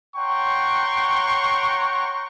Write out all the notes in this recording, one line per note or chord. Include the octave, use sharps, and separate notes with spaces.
C#5 F#5 G5 A#5 C6 C#6